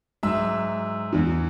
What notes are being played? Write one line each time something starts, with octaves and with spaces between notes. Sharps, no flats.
G#2 F#3 E5 E6
E2 E3